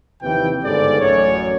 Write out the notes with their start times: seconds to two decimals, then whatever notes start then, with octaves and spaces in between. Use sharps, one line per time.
0.22 D#2 C3 E3 F3 B4 G5
0.64 G1 C#2 G#2 G#3 A4 D5
1.00 A1 F#2 C#5